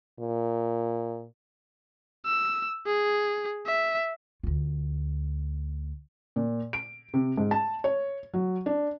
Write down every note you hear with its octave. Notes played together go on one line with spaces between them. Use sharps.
A#2
E6
G#4
E5
D2 F4
A#2
D7
C3
G#2
A5
C#5
F#3
D4